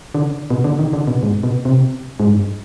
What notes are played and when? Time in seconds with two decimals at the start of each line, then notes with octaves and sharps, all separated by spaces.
0.14 D3
0.50 B2
0.64 D3
0.79 D#3
0.93 D3
1.07 B2
1.23 G#2
1.43 B2
1.65 C3
2.20 G#2
2.30 G2